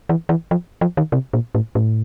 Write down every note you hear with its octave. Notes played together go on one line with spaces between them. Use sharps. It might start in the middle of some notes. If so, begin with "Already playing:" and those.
E3
E3
F3
F3
D#3
C3
A#2
A2
A2